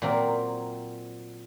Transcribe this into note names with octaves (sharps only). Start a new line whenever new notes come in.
A#2 F#3 C4 F4 A#4